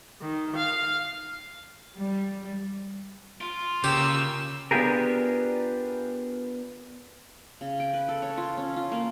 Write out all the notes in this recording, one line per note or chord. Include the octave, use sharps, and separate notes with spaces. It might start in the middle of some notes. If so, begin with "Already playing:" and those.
D#3
F5
G3
F4
C#3 A#3 G4 E6
B3 D4 F4 G4 G#4 A#4
C#3
G5
B4
A4
C#5
F4
C#4
F4
A#3